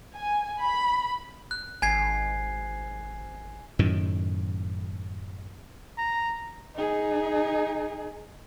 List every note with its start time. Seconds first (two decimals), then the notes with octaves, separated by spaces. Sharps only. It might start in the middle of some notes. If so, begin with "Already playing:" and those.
0.17 G#5
0.61 B5
1.51 F#6
1.82 G#1 G#5 G#6 C7
3.79 F#2 A2 D#3
5.98 A#5
6.75 D#4 G#4